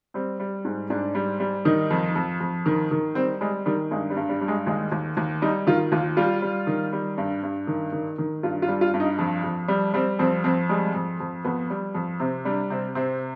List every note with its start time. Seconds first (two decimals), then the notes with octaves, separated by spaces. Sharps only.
0.14 G3 C4
0.40 G3
0.65 G#2
0.90 G#2 D4
1.15 G3
1.40 G3
1.65 D#3 D#4
1.90 F2
2.15 F2
2.40 F2
2.66 D#3
2.91 D#3
3.15 G3 C4
3.41 G3 G#3
3.66 D#3 G3
3.91 G2 G#3
4.10 G3
4.16 G2
4.29 G3
4.41 G3
4.48 G#3
4.67 D#2 G#3
4.92 D#2
5.17 D#2
5.42 G3 D#4
5.67 D#3 F4
5.92 D#2 F4
6.17 G3 F4
6.42 G3
6.67 D#3
6.93 G3
7.18 G2
7.43 G2
7.67 D#3
7.92 D#3
8.18 D#3
8.43 G2 F4
8.62 F4
8.68 G3
8.81 F4
8.94 G2
9.00 D#4
9.18 F2
9.44 F2
9.68 G3
9.94 G3 C4
10.19 F2 C4
10.44 F2 C4
10.69 G3 G#3
10.94 F2
11.20 F2
11.44 F2 B3
11.70 G3
11.94 F2
12.20 C3 C4
12.45 G3 D4
12.70 C3 C4
12.95 C3 C4